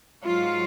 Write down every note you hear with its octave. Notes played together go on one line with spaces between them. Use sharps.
G#2 F#3 F4